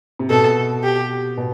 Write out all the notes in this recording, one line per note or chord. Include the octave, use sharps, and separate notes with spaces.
C3
B2 A4
G4
B2